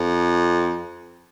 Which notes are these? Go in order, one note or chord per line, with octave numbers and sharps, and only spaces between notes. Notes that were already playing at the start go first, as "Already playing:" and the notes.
Already playing: F2